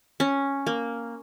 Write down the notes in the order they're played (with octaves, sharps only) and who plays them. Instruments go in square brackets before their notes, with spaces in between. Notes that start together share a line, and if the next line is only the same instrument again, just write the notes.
[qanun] C#4
A#3